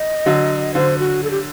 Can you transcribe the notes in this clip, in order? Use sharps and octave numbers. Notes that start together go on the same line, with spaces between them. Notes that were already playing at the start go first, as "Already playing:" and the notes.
Already playing: D#5
D3 F#3
D3 F#3 C5
F#4
A4
G4